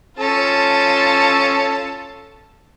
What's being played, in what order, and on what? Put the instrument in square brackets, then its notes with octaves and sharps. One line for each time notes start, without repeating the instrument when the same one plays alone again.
[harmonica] C#4 A4 [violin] F4 A5